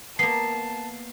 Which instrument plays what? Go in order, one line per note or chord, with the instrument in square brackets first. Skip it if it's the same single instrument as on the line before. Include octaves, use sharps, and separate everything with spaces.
[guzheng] A#3 B3 [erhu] A5 [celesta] C7